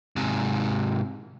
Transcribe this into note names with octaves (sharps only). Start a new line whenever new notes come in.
G#2 C3